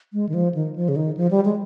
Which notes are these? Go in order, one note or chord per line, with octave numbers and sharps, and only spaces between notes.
G#3
D#3
F3
D#3
F3
C#3
D#3
F3
G3
G#3